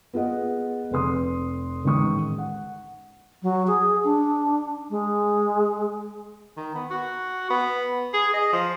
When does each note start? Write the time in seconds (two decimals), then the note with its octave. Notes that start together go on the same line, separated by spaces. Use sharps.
0.14 B3 F4 G#4 D#5 F#5
0.91 F1 F2 B4 C6 D#6
1.84 A1 G#2 D#3 C#6 D#6
2.38 F#5
3.43 F#3
3.67 G#4
4.04 D4
4.90 G#3
6.57 D#3
6.75 B3
6.90 F#4
7.50 B3
8.13 G#4
8.34 D#5
8.53 F3